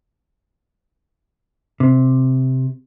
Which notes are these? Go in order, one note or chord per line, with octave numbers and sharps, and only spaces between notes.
C3